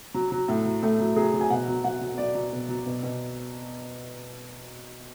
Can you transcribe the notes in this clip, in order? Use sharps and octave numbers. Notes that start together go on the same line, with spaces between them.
F#3
F#3
A2
F#3
A2 A3
F#3
F#3 G#4
F#3
G#5
B2 F#5
F#3
F#3 F#5
F#3
F#3 D5
F#3
B2
F#3
B2
B2